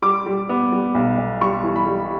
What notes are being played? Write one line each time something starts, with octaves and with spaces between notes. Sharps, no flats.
G3 D6
G3
B3
G3
B1
B1
G3 C#6
E3
B5
G3